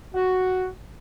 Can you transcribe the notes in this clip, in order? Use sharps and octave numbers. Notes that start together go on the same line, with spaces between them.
F#4